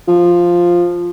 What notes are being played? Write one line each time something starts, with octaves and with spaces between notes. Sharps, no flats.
F3